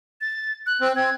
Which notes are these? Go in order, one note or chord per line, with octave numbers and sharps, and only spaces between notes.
A6
F#6
C4
C4 G#6